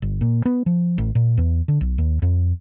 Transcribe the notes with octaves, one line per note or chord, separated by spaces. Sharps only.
G1
A#2
B3
F3
A1
A#2
E2
D3
B1
D#2
F2